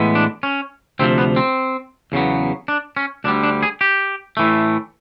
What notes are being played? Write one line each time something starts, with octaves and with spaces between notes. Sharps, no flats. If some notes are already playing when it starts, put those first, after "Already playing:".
Already playing: A2 E3 G#3 B3
D4
C#4
D2 C3 F3 C4
B3
C4
E2 C#3 F#3 B3
D4
C#4
D2 D3 G3 D4
D4
G#4
G4
A2 E3 A3